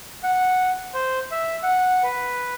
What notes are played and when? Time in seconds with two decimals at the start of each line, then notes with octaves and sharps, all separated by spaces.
0.23 F#5
0.94 C5
1.31 E5
1.63 F#5
2.03 B4